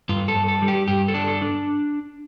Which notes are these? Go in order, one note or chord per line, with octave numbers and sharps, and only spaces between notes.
G2 F4
A4
G2
A4
G3
G4
G2 G4
A4
D4
A4
D4